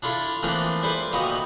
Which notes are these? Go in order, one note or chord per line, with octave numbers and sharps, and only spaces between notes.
D4 E4 F4 A4
E3 F3 A3 A#3 C4 D4
A4 B4 C5 D5 E5
A#2 D#3 B3 D#4 F#4